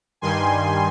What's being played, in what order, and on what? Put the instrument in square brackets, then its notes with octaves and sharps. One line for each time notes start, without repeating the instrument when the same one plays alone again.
[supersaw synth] G2 D#3 G3 G#5 C6